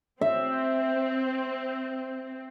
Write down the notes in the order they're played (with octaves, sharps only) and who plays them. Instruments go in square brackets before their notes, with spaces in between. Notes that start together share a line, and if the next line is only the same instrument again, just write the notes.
[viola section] C4 [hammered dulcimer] E5